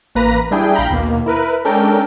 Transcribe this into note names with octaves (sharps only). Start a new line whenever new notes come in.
A1 A#3 B4 A#5 A#6
G3 D4 E4 G#4 G5
A#1 F5 G5 A#5 B5 G6
D#2 B2 A#3
E4 A#4 B4
G#3 C#4 D4 A4 A#4 G5